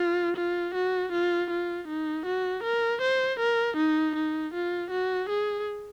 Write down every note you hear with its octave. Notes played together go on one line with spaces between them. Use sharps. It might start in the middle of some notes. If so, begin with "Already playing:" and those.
Already playing: F4
F4
F#4
F4
F4
D#4
F#4
A#4
C5
A#4
D#4
D#4
F4
F#4
G#4